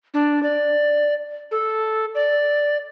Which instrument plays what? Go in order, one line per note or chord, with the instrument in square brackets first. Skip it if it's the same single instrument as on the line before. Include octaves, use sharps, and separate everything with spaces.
[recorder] D4
D5
A4
D5